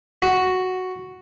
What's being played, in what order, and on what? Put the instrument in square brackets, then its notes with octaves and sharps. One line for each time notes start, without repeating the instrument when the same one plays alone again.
[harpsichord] F#4